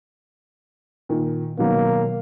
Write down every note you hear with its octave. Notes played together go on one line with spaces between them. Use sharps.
A#2 D#3
B2 D#3 F#3 A#3